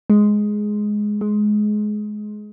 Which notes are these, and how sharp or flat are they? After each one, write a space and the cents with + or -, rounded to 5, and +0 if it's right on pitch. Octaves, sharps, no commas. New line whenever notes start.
G#3 +5
G#3 +20